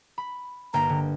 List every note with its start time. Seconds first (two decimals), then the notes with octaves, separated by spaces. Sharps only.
0.18 B5
0.74 G1 A#3 G5 A#5
0.89 D3